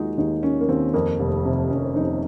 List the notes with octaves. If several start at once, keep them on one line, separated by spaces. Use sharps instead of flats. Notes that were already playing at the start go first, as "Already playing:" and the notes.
Already playing: D#2 D#3 G#3 D#4 F4 F#4
D#2 D#4
D#3 C#4
A#3
D#2 C4
F2 A#3
F1
C3
F1 C#4
F2 D#4